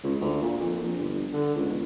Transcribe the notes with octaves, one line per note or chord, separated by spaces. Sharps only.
C#2
D2
A#2
F2
A#1
G1
D3
C#2
E1